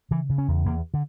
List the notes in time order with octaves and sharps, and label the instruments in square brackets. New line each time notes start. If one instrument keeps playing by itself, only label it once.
[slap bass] C#3 E3
C#3
C#4
E2
E2 A#3
D3